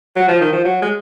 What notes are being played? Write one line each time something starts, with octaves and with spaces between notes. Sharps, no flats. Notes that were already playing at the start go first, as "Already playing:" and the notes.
F#3
F3
D#3
F3
F#3
G#3